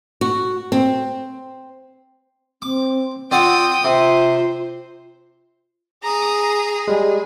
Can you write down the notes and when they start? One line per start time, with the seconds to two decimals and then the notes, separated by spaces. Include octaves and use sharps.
0.21 F#4
0.72 C4
2.62 C4 D6
3.31 C4 F4 D5 F#5 G5 D#6
3.84 C3 F4 C5
6.04 G#4 A#5 D#6
6.88 G3 G#3